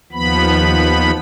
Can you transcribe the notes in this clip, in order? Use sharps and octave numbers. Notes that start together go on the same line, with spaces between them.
D#2 F3 B3 B5